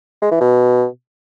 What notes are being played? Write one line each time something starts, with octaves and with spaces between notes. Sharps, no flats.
G#3
E3
B2